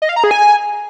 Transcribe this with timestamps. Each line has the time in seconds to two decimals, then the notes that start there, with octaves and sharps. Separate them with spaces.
0.02 D#5
0.09 F5
0.16 A#5
0.24 G#4
0.31 G#5